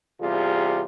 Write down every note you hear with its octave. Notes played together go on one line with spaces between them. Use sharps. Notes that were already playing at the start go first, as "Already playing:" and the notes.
E2 C3 G3 F4 G#4